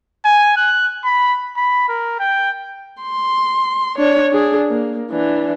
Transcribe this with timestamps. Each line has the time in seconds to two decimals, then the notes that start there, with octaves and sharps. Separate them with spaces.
0.25 G#5
0.57 F#6
1.05 B5
1.56 B5
1.89 A#4
2.20 G5
3.02 C6
3.98 D4 C#5
4.32 D4 G#4
4.69 A#3
5.10 E3 D4